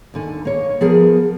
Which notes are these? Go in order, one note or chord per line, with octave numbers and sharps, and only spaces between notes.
D#2 D3 G#5
A#3 C#5
F3 B3 G#4 A#4